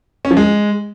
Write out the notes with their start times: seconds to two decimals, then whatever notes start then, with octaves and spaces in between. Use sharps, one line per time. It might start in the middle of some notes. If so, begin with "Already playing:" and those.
0.25 C#4
0.31 F3
0.37 G#3